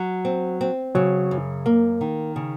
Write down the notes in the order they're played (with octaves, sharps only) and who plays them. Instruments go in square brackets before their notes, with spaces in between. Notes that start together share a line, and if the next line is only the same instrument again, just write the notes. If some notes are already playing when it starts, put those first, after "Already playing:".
Already playing: [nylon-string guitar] F#3
C4
C4
[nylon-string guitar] C#3 [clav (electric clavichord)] F#3
[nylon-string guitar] F#2
A#3
D#3
C#3